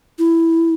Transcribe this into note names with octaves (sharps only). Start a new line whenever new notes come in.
E4